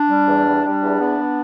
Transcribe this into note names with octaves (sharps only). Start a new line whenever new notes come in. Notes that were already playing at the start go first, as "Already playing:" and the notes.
Already playing: D4
G3
E2
G3
G3 D4
E2
B3
B3